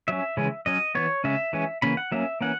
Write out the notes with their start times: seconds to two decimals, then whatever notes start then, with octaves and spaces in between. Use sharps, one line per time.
0.08 F#3 C#4 E5
0.37 C#3 E3 G#3 C#4
0.66 F#3 C#4 D#5
0.95 E3 B3 C#5
1.24 C#3 G#3 C#4 E5
1.53 E3 G#3 C#4
1.82 C#3 E3 A#3 C#4 B5
1.97 F#5
2.12 F#3 A#3 C#4 E5
2.41 E3 A#3 C#4 F#5